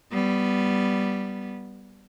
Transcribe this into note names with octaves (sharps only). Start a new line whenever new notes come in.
G3 B3